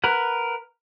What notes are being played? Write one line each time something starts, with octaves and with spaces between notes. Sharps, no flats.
A#4 B4 F#5